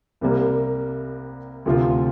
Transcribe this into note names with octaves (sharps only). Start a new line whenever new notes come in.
C2 C3 G3 A#3
D2 C3 F3 C4 F4